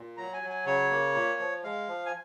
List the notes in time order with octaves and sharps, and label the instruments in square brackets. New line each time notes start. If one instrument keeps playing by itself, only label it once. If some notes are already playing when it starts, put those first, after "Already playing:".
Already playing: [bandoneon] A#2
F#3 A#5
G#5
F#3
G#5
C#3 C#5
A#3
A#2
F3
G#3 F5
F3
G#5